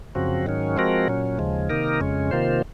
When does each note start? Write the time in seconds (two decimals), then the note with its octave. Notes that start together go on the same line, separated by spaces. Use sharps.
0.15 F#2 C#3 F3 C4 F#4
0.46 G#2 D#3 F#3 C#4
0.77 F3 G#3 C4 F#4 A#4
1.08 A#2 F#3 C#4
1.39 D#2 C#3 F3 G#3
1.70 C3 D#3 A#3 D#4 A#4
2.00 F2 C#3 G#3 C#4
2.31 C3 D#3 A#3 F4 C5